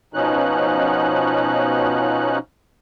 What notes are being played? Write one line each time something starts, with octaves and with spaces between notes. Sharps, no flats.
B2 F3 C#4 D#4 F#6